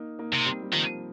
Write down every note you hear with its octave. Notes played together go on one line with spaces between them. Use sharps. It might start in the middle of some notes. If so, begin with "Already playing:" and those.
Already playing: A#3 D#4
A#3 D#4
C3
G3 C4
G3
D#3 F3 A#3